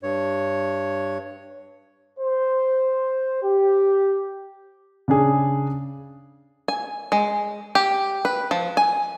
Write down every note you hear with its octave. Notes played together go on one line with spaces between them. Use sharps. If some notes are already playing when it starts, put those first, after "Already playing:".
G2 C#5
C5
G4
C#3 D4 G#4
G#5
G#3
G4
B4
F3
G#5